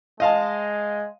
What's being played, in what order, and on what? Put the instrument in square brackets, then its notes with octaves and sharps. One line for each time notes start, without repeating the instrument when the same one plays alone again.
[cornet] G#3 [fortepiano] D#5 F5 A5